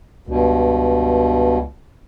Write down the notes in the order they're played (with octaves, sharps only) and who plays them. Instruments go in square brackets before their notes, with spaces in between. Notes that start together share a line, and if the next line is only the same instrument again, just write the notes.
[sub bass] C#2 [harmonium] G2 B2